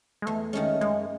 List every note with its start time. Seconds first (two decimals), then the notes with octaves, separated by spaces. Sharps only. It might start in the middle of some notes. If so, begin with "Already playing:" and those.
0.22 G#3
0.26 E2 A3
0.53 D#3 G#3 A3 C#4
0.81 F#2 G#3